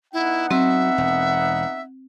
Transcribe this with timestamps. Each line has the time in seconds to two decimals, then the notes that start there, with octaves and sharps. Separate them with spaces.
0.13 B3 D#4 E4 F#5
0.51 F#3 C4 E5
0.98 E1